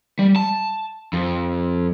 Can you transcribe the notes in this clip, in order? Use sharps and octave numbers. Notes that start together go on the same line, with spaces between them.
G3
A5
F2